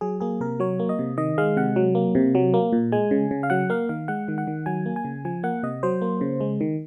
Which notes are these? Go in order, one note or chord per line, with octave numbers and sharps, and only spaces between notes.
F#3 G#4
A#3 G#4
C3 A#4
F#3 C#5
A#3
D#5
C3
D#3 D#5
G#3 F5
C3 F#5
F#3
A#3
C3
F#3
A#3
A#2
G#3 G#5
C#3
C#3
F5
F#3 F#5
A#3 F5
D#3 F5
G#3 F#5
D#3
F#5
D#3
F#3 G#5
A#3
G#5
C#3
F3 G#5
A#3 F#5
C3 D#5
F#3 C5
A#3
C#3
G#3
D#3